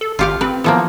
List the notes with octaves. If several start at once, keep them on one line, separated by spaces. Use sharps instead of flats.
A4
G#1 F4 G4 F5
C4 B4
E3 F3 A#3 B3